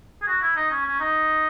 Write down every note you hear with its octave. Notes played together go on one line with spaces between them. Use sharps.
G#4
F#4
E4
D#4
C#4
C#4
D#4